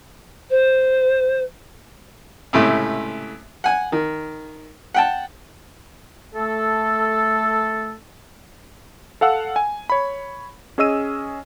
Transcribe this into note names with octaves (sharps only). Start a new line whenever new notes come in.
C5
C#2 A2 C3 A3
F#5 G#5
D#3
F#5 G5 A5
A3 A4
A4 F5 F#5 E6
G#5
C#5 B5
C#4 G#4 D#5 E6 D#7